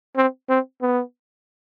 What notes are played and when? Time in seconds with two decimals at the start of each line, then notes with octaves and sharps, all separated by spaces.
0.17 C4
0.49 C4
0.82 B3